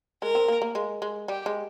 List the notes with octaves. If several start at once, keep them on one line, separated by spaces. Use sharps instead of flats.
G#3 A#4
C4
A#3
A#3
G#3
G#3
G3 G4
G#3